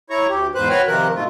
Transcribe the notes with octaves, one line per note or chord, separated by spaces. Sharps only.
E4 C#5 A#5 C#6
D2 G4
E2 G#2 B4 C5 F#6
F#4 B4 C#5 G5 B5 F6
C3 D#3 F3 A#4 F#6
G#2 B2 A3 F4